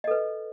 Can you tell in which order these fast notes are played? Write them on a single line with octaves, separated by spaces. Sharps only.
D#5 A4 B4